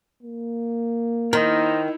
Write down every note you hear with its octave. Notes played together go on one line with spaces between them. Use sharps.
A#3
D#3 D#4 E4 A#4 C5 D#5